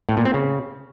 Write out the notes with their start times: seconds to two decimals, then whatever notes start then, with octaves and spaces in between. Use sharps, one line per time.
0.09 A2
0.17 A#2
0.25 C4
0.34 C#3